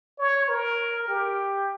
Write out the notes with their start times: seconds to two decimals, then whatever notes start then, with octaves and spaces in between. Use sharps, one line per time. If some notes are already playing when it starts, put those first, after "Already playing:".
0.19 C#5
0.48 A#4
1.08 G4